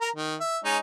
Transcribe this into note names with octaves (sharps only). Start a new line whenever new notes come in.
A#4 A#5
D#3
E5
G#3 C#4 D#4